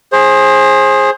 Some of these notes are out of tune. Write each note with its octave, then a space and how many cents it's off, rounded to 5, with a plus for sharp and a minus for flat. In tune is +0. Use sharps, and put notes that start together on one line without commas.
G#4 +0 C5 +30